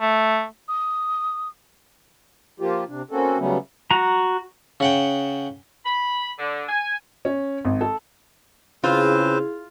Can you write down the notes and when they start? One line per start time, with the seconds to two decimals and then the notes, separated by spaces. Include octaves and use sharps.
0.01 A3
0.68 D#6
2.60 F3 A#3 F4 G4
2.89 C3 D4
3.11 A#3 C4 C#4 F#4 A4
3.39 C#3 F#3 G3 A3 B3 C#4
3.91 F#4 A#5
4.80 C#3 F#5 G5
5.85 B5
6.39 D3
6.68 G#5
7.25 C#4
7.65 G#1
7.81 A4
8.84 C#3 C4 E4 F4 G#4 B4 C5